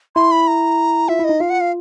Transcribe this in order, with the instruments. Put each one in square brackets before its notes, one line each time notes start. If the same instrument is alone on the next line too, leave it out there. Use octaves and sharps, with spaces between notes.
[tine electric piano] E4 [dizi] C6
[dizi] B5
A#5
[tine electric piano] F4 [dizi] E5
[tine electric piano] E4 [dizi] D#5
[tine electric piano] D#4
[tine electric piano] F4 [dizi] F5
[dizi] F#5
F5